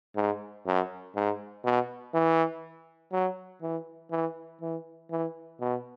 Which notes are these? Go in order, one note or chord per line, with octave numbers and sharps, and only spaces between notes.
G#2
F#2
G#2
B2
E3
F#3
E3
E3
E3
E3
B2